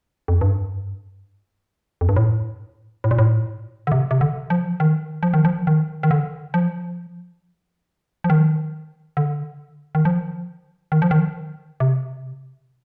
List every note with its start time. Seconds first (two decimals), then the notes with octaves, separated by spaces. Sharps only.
0.28 F2
0.41 G2
2.01 F2
2.09 G2
2.16 A2
3.04 A2
3.11 A#2
3.19 A2
3.87 D3
3.92 C3
4.11 C3
4.21 D3
4.50 F3
4.80 D#3
5.23 F3
5.34 D#3
5.45 F3
5.67 D#3
6.03 D#3
6.11 D3
6.54 F3
8.24 F3
8.30 D#3
9.17 D3
9.95 D#3
10.05 F3
10.92 D#3
11.02 F3
11.11 D#3
11.80 C3